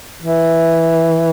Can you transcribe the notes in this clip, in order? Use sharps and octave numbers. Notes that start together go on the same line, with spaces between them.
E3